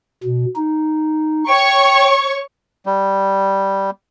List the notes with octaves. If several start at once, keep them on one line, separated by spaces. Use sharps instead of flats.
B2
D#4
C#5 G5 C#6
G3